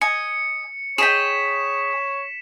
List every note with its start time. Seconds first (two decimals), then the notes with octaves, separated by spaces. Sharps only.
0.01 D#5 G#5 C#7
0.98 G#4 C#5 D#5 G5 B6 E7